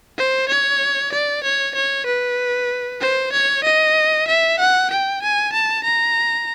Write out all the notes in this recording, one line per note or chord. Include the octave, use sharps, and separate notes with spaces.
C5
C#5
D5
C#5
C#5
B4
C5
C#5
D#5
E5
F#5
G5
G#5
A5
A#5